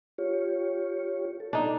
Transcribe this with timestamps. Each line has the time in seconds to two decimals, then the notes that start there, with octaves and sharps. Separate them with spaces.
0.18 F4 G4 C#5
1.40 A4
1.53 D4 D#4